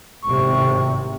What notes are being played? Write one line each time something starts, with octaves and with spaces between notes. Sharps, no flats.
G#1 A2 C3 C#6